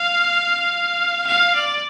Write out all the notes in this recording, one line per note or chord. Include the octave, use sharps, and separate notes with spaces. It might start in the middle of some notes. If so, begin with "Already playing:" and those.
Already playing: F5
F5
D5